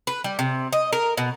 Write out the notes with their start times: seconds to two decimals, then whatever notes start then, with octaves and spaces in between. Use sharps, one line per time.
0.07 B4
0.24 G3
0.39 C3
0.73 D#5
0.93 A#4
1.17 B2